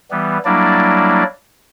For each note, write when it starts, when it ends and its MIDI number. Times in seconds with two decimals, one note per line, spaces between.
0.11 0.38 52
0.11 0.38 55
0.11 0.38 59
0.45 1.23 54
0.45 1.23 55
0.45 1.23 58
0.45 1.23 62
0.45 1.23 64
0.45 1.23 74